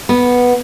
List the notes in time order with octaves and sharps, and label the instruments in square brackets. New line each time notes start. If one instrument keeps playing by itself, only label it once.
[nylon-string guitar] B3